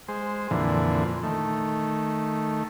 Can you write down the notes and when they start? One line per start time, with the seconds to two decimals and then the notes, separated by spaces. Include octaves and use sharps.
0.08 G#3 C5
0.51 F2 A#2 D3 E3
1.23 D#3 A3